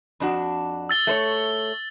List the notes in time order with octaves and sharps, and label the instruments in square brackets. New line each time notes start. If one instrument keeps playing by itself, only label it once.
[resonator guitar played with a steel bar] F2 D4 F#4
[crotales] E6 A6 G7
[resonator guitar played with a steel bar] A3 C5 C#5